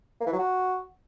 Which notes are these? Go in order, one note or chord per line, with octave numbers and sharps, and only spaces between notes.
A#3
E3
F#3
F#4